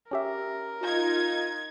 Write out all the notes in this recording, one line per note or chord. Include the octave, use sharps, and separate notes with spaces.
C#4 G4 A#4 E5
D#4 F4 G#6